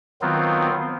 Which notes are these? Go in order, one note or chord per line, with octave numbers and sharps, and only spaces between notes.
D#3 F#3 B3 C4 F4